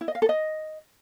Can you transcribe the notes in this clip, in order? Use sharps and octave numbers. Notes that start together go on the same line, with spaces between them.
E4
D#5
F5
A4
D#5